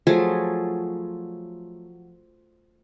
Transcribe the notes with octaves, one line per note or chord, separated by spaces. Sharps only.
F3 F#3 A3 G#4